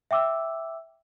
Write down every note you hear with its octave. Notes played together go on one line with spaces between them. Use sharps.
E5 G5 D6 E6